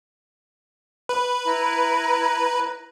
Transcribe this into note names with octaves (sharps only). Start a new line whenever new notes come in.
B4
E4 A#5